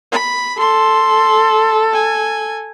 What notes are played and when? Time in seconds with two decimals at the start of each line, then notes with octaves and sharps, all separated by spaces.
0.12 B5
0.59 A4 C6
1.93 G#5